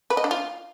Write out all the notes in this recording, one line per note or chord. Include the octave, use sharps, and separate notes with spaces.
B4
D#5
D4
F4